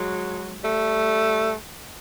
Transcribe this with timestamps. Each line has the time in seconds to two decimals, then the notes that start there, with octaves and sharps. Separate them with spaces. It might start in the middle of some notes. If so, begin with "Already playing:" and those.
Already playing: F#3 G#3
0.63 G3 A3